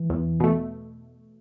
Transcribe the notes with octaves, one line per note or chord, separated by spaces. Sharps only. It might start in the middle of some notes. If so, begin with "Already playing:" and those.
Already playing: E3
E2
B2 A3